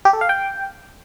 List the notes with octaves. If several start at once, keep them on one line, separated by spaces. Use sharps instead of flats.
G4
A4
F5
G5